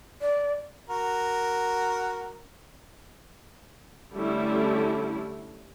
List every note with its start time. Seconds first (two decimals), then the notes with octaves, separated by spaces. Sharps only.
0.21 D5
0.89 F#4 A#4
4.14 D3 G3 A3 C#4 E4